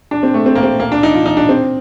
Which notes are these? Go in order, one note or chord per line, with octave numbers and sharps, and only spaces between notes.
D4
C4
A3
C4
A#3
C4
A#3
D4
D#4
F4
D#4
D4
C4